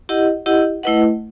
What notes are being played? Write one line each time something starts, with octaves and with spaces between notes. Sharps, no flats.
E4 G4 D#5 F#5
E4 G4 D#5 F#5
A3 E4 B4 D#5 F#5